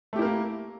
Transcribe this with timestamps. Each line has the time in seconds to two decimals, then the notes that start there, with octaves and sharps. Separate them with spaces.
0.13 A3
0.16 G4
0.19 E4
0.22 A#4
0.25 A#3